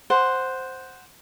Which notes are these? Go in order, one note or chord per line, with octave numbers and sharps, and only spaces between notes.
C5 F#5